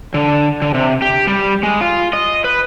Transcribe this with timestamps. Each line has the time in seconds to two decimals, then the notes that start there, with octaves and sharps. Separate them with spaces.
0.14 D3
0.62 D3
0.74 C3
1.02 G4
1.27 G3
1.63 G#3
1.81 F4
2.13 D#5
2.44 B4